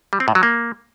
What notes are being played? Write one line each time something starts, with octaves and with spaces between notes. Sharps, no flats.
G3
C4
A2
F#3
A#3